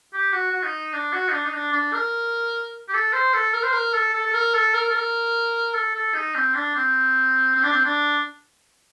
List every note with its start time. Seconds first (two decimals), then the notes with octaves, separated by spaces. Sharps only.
0.13 G4
0.33 F#4
0.52 F#4
0.63 D#4
0.94 D4
1.13 F#4
1.29 D#4
1.33 D4
1.45 D#4
1.54 D4
1.73 D4
1.93 A#4
2.88 G4
2.94 A4
3.13 C5
3.34 A4
3.54 A#4
3.64 C5
3.73 A#4
3.94 A4
4.14 A4
4.27 A4
4.34 A#4
4.54 A4
4.74 A#4
4.89 A4
4.95 A#4
5.74 A4
5.94 A4
6.14 D#4
6.35 C4
6.55 D4
6.75 C4
7.55 C4
7.63 D4
7.73 C4
7.85 D4